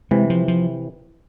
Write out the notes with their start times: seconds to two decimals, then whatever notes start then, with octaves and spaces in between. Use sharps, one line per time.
0.11 C3 E3 G#3
0.30 F3
0.48 F3